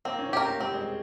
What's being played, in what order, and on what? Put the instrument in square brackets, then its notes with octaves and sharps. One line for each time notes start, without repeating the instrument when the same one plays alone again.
[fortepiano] A#3 [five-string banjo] C4
[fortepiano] C#4
C#4
[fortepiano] C4 [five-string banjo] G4 A#4
[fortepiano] A#3
[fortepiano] G3 [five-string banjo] C4
[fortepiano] G#3